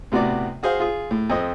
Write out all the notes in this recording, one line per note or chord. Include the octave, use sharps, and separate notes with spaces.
A2 C3 B3 F#4 D5
F#4 G#4 C5 F5
F4 G#4
A2
F2 C4 D#5